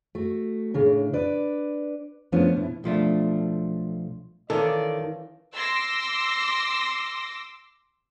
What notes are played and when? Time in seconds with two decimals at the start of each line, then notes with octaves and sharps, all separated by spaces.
0.15 A3 F#4
0.74 A2 C#3 D4
1.13 D4 B4 D5
2.32 F3 A3 B3 C#4 D4 F4
2.57 B2 E4
2.84 B1 F3 A3 D4
4.50 D#3 E3 C#4 F4 A4 D5
5.56 C6 D6 E6 A#6